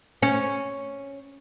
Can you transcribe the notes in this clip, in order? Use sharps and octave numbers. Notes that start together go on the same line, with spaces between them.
C#4